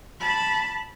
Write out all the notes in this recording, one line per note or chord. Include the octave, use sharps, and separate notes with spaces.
A5 B5